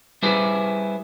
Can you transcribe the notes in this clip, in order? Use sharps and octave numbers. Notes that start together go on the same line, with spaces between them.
G3 E4 G4 G#4 B4 C5